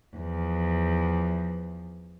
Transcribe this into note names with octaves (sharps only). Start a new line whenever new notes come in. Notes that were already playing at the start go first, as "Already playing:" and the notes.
E2 F3